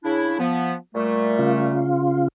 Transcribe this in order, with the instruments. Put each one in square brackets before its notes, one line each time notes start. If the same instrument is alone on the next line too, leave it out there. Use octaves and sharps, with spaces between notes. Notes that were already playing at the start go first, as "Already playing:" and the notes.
[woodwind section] C#3 D4 E4
F3 B3
A#2 G3 A3
[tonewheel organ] C#3 F4